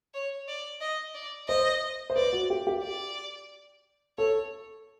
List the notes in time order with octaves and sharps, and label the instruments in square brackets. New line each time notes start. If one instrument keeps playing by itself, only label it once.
[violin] C#5
D5
D#5
D5
[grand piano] C5 [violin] D#5
[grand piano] C5
[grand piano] B4 [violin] D5
[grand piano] F#4
G4
G4
[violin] D5
[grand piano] A4 [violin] C#5